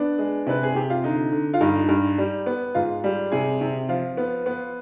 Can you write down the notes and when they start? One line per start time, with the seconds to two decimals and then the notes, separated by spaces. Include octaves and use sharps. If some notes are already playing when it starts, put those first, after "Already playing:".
Already playing: B3 D4
0.18 G#3
0.47 C3 B4
0.63 G#4
0.75 C3 G4
0.90 F4
1.04 D3 D#4
1.32 D3
1.54 F4
1.61 G2 D#4
1.89 G2
2.18 G3
2.46 B3
2.75 G#2 F4
3.04 G3
3.32 C3 G#4
3.61 C3
3.89 F3 F4
4.17 B3
4.46 B3